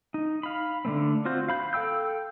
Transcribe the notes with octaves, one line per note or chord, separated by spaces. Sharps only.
D#4
F5 B5
D3 A3 C4
C4 F4 F#4 C5
F5 B5 G6
A4 F5 G5 E6 G6